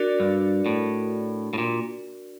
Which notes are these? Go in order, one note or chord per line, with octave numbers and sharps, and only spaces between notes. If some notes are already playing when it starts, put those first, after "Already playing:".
Already playing: D4 F#4 A#4 D5
G2
A2
A2
A#2